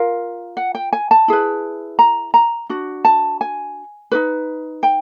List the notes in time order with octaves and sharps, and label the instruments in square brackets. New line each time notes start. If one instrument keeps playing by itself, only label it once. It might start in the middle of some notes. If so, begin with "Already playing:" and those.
Already playing: [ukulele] F4 A#4 F5
F#5
G5
G#5
A5
E4 G#4 B4
A#5
A#5
D4 F#4
A5
G#5
D#4 F#4 B4
G5